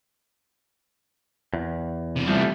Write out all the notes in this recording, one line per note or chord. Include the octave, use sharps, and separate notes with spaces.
E2
C3 E3
F3 G3 A3